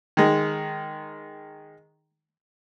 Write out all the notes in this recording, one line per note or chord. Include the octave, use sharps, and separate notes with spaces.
D#3 G#3